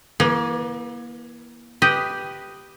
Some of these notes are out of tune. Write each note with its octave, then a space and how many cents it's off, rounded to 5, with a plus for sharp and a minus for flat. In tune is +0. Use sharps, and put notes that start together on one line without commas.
E3 +0 A#3 +35
G4 +0 B4 +0 D#5 +0